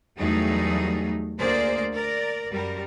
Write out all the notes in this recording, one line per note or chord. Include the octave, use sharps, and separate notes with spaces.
E2 F#3 G3 A3 D#4 G#4
D2 A#3 G#4 C5 D5
A#4 D5
F#2 G3 A#4